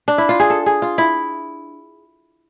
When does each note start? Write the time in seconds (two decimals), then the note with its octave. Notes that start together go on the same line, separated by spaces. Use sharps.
0.08 D4
0.18 E4
0.29 F4
0.40 G#4
0.50 A4
0.66 G#4
0.82 F4
0.98 E4